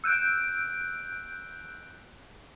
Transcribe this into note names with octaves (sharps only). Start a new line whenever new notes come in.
E6 F#6 G6 D7